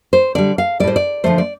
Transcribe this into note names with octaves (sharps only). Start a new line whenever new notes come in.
C5
D3 G3 D5
F5
A2 G3 C5 D5
D5
D3 F3 A3 C5
D5